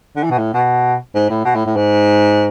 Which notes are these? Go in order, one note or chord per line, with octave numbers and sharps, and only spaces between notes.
D3
E3
B2
A2
B2
G#2
A2
B2
A2
A2
G#2